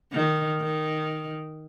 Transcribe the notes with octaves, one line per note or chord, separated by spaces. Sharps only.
D#3
D#3